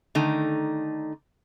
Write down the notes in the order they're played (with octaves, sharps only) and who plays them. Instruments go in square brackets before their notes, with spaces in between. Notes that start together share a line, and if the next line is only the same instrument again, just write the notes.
[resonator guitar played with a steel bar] D3 D#3 A3 D#4